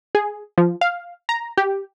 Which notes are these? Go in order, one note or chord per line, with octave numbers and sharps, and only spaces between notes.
G#4
F3
F5
A#5
G4